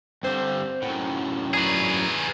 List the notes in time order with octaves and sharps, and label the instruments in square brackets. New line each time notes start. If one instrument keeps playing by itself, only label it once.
[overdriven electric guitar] G2 D3 [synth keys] C4 C5
[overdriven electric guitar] F#2 A2 [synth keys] F#5 G5
[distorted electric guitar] G#4 B4 [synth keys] D5 A#5 C#6